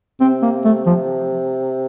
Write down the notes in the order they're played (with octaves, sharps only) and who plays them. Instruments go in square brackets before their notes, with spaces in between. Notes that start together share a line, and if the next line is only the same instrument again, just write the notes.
[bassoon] C3 [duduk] C4
[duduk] A#3
A3
F3